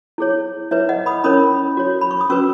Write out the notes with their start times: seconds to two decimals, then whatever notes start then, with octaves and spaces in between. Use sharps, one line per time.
0.18 E4 G#4 C#5
0.71 E4 B4 C#5 E5
0.89 D#5 F#5
1.06 B5 D#6
1.24 C#4 E4 A#4 C#5 B5 D#6
1.77 F#4 C#5
2.01 B5
2.11 C#6
2.21 D#6
2.30 C#4 F#4 B4 C#6 E6